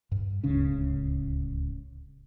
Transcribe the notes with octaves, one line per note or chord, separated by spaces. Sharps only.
G2
D1 C#2 C#3 C#4